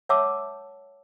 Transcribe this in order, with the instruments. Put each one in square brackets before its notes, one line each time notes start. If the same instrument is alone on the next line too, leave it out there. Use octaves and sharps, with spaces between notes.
[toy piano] C#5 E5 F#5 A5 D6 E6